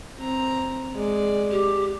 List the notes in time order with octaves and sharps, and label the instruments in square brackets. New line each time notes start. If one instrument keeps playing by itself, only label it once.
[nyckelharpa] C4 A#5
G#3 D5
[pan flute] G4